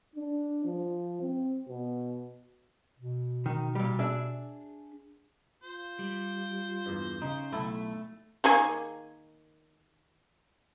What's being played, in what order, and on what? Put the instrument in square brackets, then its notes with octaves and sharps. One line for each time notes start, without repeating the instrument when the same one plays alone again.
[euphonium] D4
F3
C4
B2
[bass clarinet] B2
[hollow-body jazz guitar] D#3
A#2 G3
D4 G#4 E5
[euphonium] F4 [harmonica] C5
[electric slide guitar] G3
[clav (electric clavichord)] E2 G2
[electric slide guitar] C#3 [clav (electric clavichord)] D#4
[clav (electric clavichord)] B1 E4 A4 [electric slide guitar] A3
[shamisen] D#3 A#3 G#4